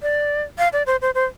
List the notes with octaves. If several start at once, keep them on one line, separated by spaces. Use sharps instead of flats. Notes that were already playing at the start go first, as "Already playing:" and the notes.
D5
F5
D5
C5
C5
C5